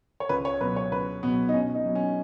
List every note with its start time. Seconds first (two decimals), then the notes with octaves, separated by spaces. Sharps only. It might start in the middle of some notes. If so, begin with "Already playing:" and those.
0.20 C#5
0.29 C#2 B4
0.45 C#5
0.61 B2 F#3 B4
0.76 C#5
0.91 C#2 B4
1.23 B2 F#3 B3
1.49 D#4
1.54 B2 C#4
1.75 D#4
1.85 F#3 B3
1.95 C#4